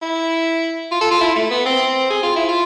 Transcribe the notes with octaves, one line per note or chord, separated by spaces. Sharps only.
E4
F4
A4
F4
E4
A3
B3
C4
G#4
F4
E4
F4